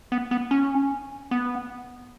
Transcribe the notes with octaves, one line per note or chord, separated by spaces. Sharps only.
B3
B3
C#4
B3